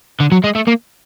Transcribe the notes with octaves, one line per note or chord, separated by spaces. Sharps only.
D3
F#3
G#3
A3
A#3